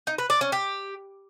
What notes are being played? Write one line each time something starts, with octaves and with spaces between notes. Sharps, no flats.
D#4
B4
D5
C#4
G4